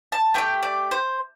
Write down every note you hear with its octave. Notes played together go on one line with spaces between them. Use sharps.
A5
A3 D4 G4 G5
D5
C5